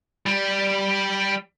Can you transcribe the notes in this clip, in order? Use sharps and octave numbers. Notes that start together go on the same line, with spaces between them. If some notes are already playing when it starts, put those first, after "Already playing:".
G3